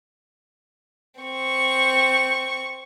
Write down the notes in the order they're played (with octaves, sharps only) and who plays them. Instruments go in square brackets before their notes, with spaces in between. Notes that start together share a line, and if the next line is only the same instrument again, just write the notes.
[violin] C4 C#6